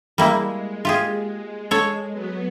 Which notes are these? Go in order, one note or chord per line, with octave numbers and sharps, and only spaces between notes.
G3 G#3 A#3 E4
F4 G4 G#4
A4 C#5
F#3 B3